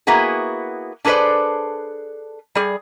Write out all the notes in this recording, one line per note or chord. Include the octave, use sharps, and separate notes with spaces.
A#3 B3 E4 F#4 G#4
D4 G#4 A4 B4 C5 D5
G3 G#4